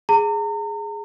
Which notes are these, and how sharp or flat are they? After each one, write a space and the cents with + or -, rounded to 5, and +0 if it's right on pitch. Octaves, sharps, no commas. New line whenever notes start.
G#4 +0 A#5 -40